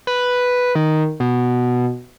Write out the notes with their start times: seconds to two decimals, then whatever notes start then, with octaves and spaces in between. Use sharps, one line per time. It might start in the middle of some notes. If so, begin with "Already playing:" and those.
0.07 B4
0.75 D#3
1.20 B2